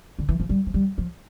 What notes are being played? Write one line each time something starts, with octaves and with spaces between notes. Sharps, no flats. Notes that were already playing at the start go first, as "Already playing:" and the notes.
D3
E3
F3
G3
F3
G3
F3